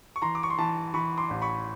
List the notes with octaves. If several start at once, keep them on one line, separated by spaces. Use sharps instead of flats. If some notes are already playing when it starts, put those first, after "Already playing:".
C#6
E3 A#5 C6
D6
C#6
C6
E3 A5 B5
E3 B5 C#6
C6 D6
A1
B5 C#6